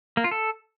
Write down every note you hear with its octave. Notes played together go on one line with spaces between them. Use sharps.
A#3
F4
A4